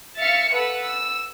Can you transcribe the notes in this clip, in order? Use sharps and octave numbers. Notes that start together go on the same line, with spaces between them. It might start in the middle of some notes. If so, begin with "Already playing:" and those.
E5 F5 F6 A6 C#7
A4 B4 F#5 E6
E6